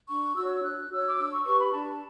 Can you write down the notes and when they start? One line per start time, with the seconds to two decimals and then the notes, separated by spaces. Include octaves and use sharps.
0.08 D4 C#6
0.35 F#4 C#5 E6
0.63 D4 F#6
0.91 F#4 C#5 E6
1.08 D6
1.18 D4 E6
1.32 C#6
1.45 G4 B4 C#6
1.59 B5
1.72 D4 A5